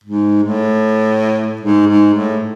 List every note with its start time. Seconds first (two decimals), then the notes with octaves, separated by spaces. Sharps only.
0.04 G#2
0.44 A2
1.61 G#2
1.87 G#2
2.13 A2